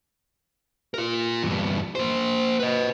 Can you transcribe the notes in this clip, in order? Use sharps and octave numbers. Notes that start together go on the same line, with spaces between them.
F4 A#4
E2 G2
A#3 C5
B4 D#5